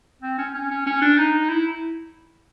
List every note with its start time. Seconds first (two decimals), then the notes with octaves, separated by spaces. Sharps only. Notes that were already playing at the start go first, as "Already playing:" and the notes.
0.22 C4
0.38 C#4
0.54 C#4
0.71 C#4
0.86 C#4
1.02 D4
1.18 D#4
1.49 E4